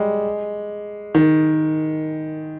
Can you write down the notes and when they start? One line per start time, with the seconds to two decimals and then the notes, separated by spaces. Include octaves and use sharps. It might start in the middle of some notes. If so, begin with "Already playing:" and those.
Already playing: G3 G#3
1.15 D#3